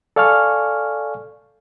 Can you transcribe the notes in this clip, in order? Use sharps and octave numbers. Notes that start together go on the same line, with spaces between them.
A4 D5 F5 G#5 C#6 F6